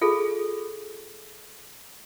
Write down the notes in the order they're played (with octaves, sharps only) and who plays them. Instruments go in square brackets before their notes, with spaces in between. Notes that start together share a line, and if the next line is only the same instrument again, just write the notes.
[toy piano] F4 G#4 A4